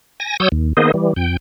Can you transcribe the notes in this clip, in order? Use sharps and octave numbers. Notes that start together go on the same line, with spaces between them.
G#5 A#6
F#3 C#5 D#6 E6 G6
D#2
D#3 A#3 B3 G#4 C5 D#5
E3 G3
F2 G5